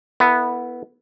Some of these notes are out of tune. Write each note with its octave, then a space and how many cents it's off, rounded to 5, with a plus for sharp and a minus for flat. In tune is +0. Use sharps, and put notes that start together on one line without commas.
B3 -5 E4 +0 A4 +35